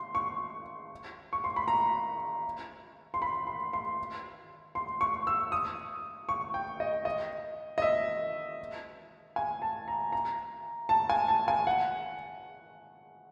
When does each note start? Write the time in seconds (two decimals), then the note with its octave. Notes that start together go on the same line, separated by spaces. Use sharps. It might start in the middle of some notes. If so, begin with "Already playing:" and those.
Already playing: C6
0.15 C#6
1.33 C#6
1.44 C6
1.56 B5
1.68 A#5
3.14 C6
3.22 B5
3.47 C6
3.73 C6
4.75 C6
5.01 C#6
5.27 E6
5.52 D#6
6.29 C#6
6.54 G5
6.80 D#5
7.05 D#5
7.78 D#5
7.82 E5
9.36 G#5
9.62 A5
9.88 A#5
10.13 A#5
10.89 A5
11.10 G#5
11.28 A5
11.48 G#5
11.67 F#5